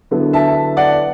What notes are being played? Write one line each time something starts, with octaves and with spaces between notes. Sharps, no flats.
D3 F#3 B3 E4
E5 A5
D5 F#5